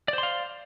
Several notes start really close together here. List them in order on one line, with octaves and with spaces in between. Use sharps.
D5 C5 C6 F5